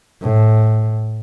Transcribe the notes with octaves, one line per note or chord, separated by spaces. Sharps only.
A2